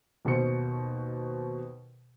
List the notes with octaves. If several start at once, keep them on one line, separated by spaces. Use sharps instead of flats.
D#2 B2 C5 C#7